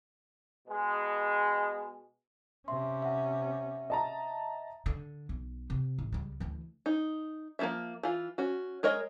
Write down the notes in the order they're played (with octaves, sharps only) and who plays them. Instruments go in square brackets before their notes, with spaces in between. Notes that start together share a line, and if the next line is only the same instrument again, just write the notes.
[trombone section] B2 G#3
[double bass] C3 C#4 [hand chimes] E5 C6
[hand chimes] E5 F#5
[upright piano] D#5 A5 A#5
[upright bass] D3
B1
C3
A1
C#2 G3
D2 E3
[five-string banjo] D#4
F3 A#3 E4 F4 E5
E3 F4
C#4 F#4
G#3 A#4 C#5 D#5